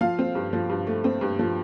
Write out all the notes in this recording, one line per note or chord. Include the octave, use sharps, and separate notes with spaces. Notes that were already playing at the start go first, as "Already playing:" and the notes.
F3 F5
C4
G2
F3
G2
A3
C4
G2
F3